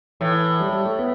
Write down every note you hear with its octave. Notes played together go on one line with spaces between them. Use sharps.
A2 E3
G3
G3
A3
B3